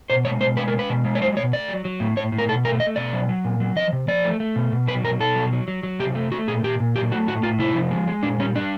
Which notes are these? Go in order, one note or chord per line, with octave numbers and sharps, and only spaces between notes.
B2 C5
G#3 C#5
B2 C5
G#3 B4
A#4
G#3
B4
B2
G#3
C#5
F#3 C5
B2 C#5
A3 D5
F#3
F#3
A2
A2 C#5
A2
A#4
B2 A4
A3 A#4
A3 D#5
B2 D5
F#3
F#3
A#2
F#3
F3 D#5
C3
F3 D5
A3
A3
B2
B2
F#3 B4
B2 A#4
B2 A4
F#3
F#3
F#3
F#3
C3 G4
A3
A3 F#4
A#2 G#4
A#2 G4
A#2
F#3 G4
A3 F#4
A2 F#4
A2 F4
C3 E4
F3
G#3
G#3
A#2 D4
G3 C#4
G3 D4